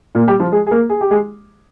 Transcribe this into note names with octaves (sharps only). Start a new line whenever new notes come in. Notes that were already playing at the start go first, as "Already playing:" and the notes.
A#2 A#3
G3 G4
F3 F4
G#3 G#4
G#4
A#3 A#4
G#4
G4
G#3 G#4